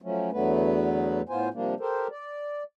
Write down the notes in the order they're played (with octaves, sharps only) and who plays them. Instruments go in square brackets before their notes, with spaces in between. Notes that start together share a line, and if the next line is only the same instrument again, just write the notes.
[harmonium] F3 F#3 A3 C#4
E2 D3 F#3 A3 B3 B4
A2 B3 F4 C5 G#5
C3 F3 G3 A#3 D4
G4 A4 A#4 C5
D5